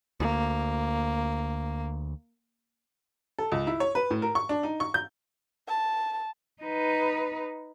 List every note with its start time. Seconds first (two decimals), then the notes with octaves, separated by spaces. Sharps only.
0.20 D2 A#3
3.38 A4
3.52 C#2
3.67 E4
3.80 C#5
3.95 B4
4.11 A2
4.22 A#4
4.35 C#6
4.49 D4
4.63 D#4
4.80 C#6
4.94 G6
5.68 A5
6.63 D#4 B4